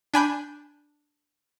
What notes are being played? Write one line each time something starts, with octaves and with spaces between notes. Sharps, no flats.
D4 G#5 B5 G6